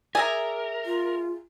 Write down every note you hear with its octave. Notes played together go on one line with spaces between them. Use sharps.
G#4 A#4 D5 E5 G#5 A#5
F4